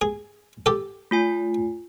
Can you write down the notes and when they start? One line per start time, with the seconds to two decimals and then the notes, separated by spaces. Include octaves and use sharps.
0.01 G#4
0.66 G4 A4
1.11 A3 F4 G#5